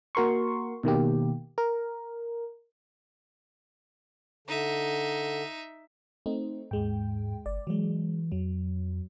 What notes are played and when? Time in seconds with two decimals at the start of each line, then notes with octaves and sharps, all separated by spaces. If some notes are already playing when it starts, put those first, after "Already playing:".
0.15 A#3 F#4 A#4 C6 C#6
0.83 B2 D#3 A#3 G4
1.58 A#4
4.48 D3 D#4 E5
6.26 A3 C4 D#4
6.71 D#2 G#2 G#3 G5
7.46 G1 D5
7.67 E3 F#3 G#3
8.32 F2 F#3